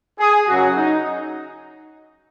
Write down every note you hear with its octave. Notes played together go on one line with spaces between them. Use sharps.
G#4
F#2 C#3 F#3 F#4
D#4